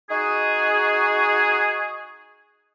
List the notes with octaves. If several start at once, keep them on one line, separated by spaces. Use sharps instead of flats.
D#4 F#4 G#4